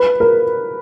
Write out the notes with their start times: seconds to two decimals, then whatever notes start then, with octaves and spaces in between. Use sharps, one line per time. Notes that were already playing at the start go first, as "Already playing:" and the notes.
Already playing: B4
0.20 A#4